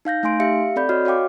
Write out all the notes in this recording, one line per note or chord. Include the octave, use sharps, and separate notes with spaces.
D#4 F5 G6 A#6
A3 D#4 G#5 C6 D7
G4 E5 F5 C#7
C4 A4 D5 B5 G6
F#4 C#5 D#5 F6
F#4 C#5 F5 G5 D6